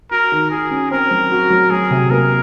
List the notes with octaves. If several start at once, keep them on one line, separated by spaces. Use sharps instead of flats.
F#4 A#4
D#3
F#4 G#4
C#4
C4 A#4
F#3
F#4
F#3
F#3 G#4
C3
A#3 A#4